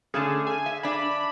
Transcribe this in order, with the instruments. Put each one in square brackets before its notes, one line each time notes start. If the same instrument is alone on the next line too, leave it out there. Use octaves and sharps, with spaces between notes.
[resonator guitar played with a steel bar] D3 A3 C#4 [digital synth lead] G#4
[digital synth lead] G#5
[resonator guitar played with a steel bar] E5
[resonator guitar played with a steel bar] D4 E5 [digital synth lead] B5